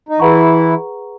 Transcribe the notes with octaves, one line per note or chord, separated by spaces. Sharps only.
D#4
E3 E4 G#4 B4 F#5 A#5 C#6